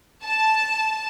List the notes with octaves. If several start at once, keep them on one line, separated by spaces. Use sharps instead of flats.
A5